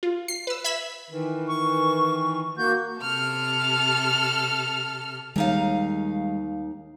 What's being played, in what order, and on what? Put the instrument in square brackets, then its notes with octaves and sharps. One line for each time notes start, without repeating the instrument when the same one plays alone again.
[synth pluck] F4
C7
B4 E6
E5 B5 G#6 B6 E7
[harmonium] D#3 E3
[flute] C#6
[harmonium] A#3 F#4 [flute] G6
[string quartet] C3 A4 F6
[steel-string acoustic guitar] D#2 D#4 F5 [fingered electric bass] D#3 G3 G#3